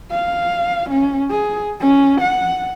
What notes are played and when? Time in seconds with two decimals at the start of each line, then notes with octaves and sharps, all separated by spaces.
0.11 F5
0.90 C#4
1.30 G#4
1.80 C#4
2.20 F#5